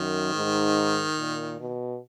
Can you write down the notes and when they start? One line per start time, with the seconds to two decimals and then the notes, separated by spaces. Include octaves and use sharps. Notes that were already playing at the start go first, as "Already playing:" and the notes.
Already playing: F#2 D#3
0.35 G#2
1.18 A#2
1.60 B2